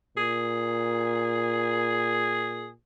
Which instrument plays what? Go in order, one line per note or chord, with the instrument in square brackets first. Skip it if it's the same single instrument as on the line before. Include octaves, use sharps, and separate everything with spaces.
[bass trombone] A#2 [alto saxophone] G#4